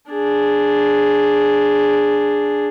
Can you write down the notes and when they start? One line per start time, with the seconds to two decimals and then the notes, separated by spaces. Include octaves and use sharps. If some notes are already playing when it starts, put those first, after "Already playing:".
0.11 D4 G#4